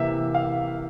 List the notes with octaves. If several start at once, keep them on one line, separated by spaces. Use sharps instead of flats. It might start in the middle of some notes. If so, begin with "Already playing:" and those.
Already playing: C3 E3 A#3 E5
F5